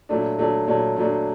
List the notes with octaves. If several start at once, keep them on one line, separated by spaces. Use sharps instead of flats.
A#2 F#3 A3 D4
A#2 F#3 A3 D4
A#2 F#3 A3 D4
A#2 F#3 A3 D4